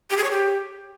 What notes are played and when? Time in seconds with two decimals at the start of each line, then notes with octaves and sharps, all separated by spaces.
0.10 G4
0.17 G#4
0.24 C#5
0.31 G4